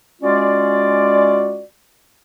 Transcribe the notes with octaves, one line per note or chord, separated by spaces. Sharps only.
G#3 C#4 F4 F#4 D5